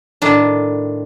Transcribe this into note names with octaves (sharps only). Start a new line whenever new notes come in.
A2 D#3 D4